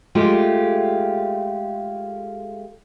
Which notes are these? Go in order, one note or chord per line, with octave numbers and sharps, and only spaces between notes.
G#3 A3 F4 G4